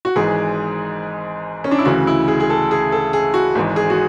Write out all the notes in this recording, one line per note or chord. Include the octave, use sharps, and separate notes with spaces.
F#4
G#1 G#2 E3 G#4
C#4
D4
E4
D2 C#3 E3 F#4
E4
G#4
G#4
A4
G#4
A4
G#4
F#4
G#1 G#2 E3
G#4
F#4